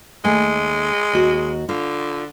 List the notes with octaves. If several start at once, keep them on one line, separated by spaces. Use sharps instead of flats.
D#2 G#3 A3 G#5
D#2 F#4
D3 F4